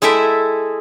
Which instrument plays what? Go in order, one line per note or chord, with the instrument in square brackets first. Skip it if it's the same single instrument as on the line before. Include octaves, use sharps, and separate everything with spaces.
[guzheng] G#3 E4 A4 E5 G5